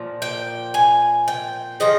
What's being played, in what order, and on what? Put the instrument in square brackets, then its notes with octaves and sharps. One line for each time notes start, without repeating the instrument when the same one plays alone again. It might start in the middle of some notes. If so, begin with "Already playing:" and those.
Already playing: [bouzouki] A#2 F3
G5
G#5
G5
C#3 F3 D#5